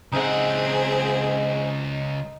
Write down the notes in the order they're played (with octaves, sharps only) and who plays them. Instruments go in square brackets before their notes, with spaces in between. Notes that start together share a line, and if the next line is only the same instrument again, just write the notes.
[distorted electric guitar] C#2 F#5 [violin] C4 G#4 [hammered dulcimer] D#4 E5